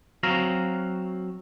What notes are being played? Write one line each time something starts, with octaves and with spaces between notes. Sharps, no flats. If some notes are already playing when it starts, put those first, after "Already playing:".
F#3 C4 F#4 F5 A#5